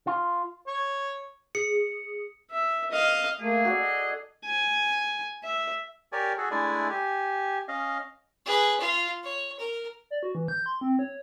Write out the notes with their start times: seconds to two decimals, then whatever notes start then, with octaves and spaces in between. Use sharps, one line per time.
0.07 F4
0.67 C#5
1.55 G#4 C#7
2.50 E5
2.91 D#5 F5
3.41 A3 A#3 G#4
3.65 F#4 A4 D5
3.81 D#5
4.45 G#5
5.44 E5
6.12 G4 A#4 C#5 D5 G#5
6.38 F#4 G#4 A4
6.51 G#3 A3 D4 E4 D5 G#5
6.90 G4 G#5
7.68 C#4 D#5 F5
8.46 G#4 B4
8.80 F4 F5
9.23 C#5
9.59 A#4
10.11 D5
10.23 F#4
10.35 E3
10.48 G6
10.66 C6
10.81 C4
10.99 C#5